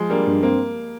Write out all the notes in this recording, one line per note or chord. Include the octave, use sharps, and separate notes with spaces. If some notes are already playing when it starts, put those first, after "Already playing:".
Already playing: F3 G#3
G3 A#3 D4
G2
A#3 C4